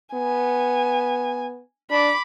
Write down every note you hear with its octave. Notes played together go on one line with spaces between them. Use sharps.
B3 G#5
D4 B5 D6